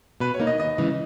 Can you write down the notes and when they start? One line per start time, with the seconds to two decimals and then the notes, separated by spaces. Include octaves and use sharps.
0.20 B2 B4
0.34 C#5
0.40 A#3 D#4
0.47 D#5
0.58 D#2 D#5
0.78 C#3 E3 G#3